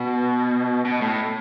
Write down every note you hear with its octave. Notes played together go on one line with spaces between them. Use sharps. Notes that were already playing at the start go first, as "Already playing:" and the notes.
Already playing: B2
B2
A2